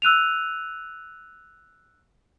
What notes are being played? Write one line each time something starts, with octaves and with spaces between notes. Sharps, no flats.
E6 F#6 D#7 F7